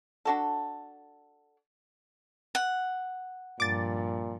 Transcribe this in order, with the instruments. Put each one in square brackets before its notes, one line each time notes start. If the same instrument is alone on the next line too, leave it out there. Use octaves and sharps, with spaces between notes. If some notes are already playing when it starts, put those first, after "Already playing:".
[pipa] D4 F#4 A4
[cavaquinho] F#5
[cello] G2 F3 [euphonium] A#2 [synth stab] D6 A6